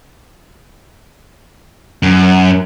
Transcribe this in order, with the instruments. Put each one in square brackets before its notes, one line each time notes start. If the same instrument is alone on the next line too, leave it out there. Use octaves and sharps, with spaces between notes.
[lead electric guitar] F#2